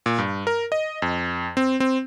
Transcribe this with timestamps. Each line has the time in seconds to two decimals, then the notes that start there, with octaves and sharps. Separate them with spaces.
0.06 A#2
0.18 G2
0.47 A#4
0.72 D#5
1.02 F2
1.57 C4
1.80 C4